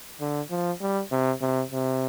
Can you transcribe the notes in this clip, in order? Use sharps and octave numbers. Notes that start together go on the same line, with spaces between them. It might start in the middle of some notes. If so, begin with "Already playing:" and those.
D3
F3
G3
C3
C3
C3